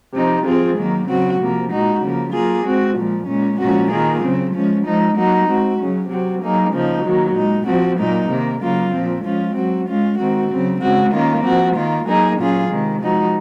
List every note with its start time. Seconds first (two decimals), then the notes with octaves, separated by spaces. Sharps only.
0.13 C3 F3 C4 D#4
0.44 F3 C4 F4 G#4
0.76 D#3 F#3 A#3
1.07 C#3 F#3 C4 F#4
1.39 C3 F3 A#3
1.70 A#2 G#3 D#4 F#4
2.01 C#3 F3 A#3
2.32 F#3 A#3 F4 G#4
2.64 G#3 C4 F#4
2.95 A#2 F3 G#3
3.27 A#2 G#3 C#4
3.59 A#2 F3 G#3 C#4 F#4
3.90 D#3 A#3 F4 G#4
4.21 C#3 F#3 C4
4.53 F3 G#3 C#4
4.84 F3 G#3 D#4
5.16 F#3 A#3 D#4 F#4
5.47 G#3 C4 F#4
5.78 C#3 F#3 C#4
6.09 C3 F#3 C4 F#4
6.41 F#3 A#3 D#4 G#4
6.72 C#3 F3 A#3 D#4
7.04 D#3 F#3 A#3
7.35 A#2 G#3 D#4
7.66 F3 C4 F#4
7.98 A#2 F#3 A#3 D#4
8.29 C3 D#3 A#3
8.61 C#3 F#3 A#3 F4
8.92 A#2 F3 C4
9.24 F3 G#3 C#4 F4
9.55 F#3 C4 F#4
9.87 G#3 C#4 F4
10.18 D#3 G#3 C4 F#4
10.50 C#3 F#3 C4
10.81 C#3 G#3 C4 F#4
11.12 D#3 A#3 C#4 F4
11.43 F3 C4 F#4
11.75 D#3 A#3 F4
12.06 F#3 A#3 D#4 G#4
12.37 A#2 F#3 C#4 F4 G#4
12.69 C3 D#3 G#3
13.01 F3 G#3 D#4 F#4